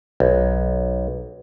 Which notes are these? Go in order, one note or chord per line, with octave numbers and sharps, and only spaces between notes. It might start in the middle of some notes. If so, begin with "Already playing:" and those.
B1